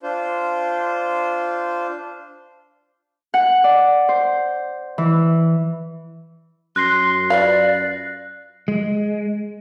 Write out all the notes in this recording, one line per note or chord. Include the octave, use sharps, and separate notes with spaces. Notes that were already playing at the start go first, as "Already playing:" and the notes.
D4 F4 C5
F#5
D5
C5
E3
F#2 C6 F#6 A#6 C7
F4 B4 D5 F5
G#3